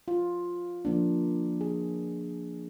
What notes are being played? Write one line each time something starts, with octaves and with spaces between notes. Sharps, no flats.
F4
F3 A#3 D4
G#4